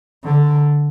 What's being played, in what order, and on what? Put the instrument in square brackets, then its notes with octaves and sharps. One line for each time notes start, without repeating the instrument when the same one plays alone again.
[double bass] D3